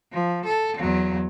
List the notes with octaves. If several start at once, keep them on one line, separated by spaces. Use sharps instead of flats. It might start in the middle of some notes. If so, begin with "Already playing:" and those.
F3
A4
E2 F#3